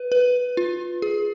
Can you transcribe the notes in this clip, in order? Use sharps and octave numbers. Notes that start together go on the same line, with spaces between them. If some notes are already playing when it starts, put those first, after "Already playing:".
Already playing: B4
B4
F4
G#4